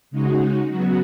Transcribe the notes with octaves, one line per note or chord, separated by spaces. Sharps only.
C#3 G#3 D#4 F#4
C#3 F#3 B3 F#4